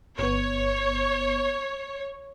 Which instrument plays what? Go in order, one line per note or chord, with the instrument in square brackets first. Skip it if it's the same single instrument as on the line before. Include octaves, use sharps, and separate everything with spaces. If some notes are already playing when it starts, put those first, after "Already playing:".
[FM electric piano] G1 B3 [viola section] C#5